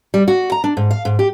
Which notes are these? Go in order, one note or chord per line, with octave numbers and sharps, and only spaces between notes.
G3
F#4
A#5
D4
G#2
F5
G#2
G4